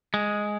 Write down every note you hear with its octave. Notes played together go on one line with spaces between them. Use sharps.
G#3